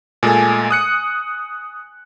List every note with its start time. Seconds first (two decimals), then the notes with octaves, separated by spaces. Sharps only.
0.23 A#2 G#3 A3 G#5
0.71 D#6 F#6 C#7